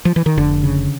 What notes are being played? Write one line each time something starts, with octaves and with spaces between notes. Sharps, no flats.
F3
E3
D#3
F1 D3
C#3